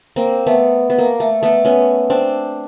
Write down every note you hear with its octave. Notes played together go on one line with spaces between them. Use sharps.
A#3 C4
A3 B3
B3
A#3
A3
A3 B3
B3 C#4
C4 D4